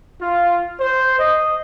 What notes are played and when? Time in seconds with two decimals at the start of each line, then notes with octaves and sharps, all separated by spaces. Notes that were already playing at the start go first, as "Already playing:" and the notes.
0.21 F4
0.80 C5
1.20 D#5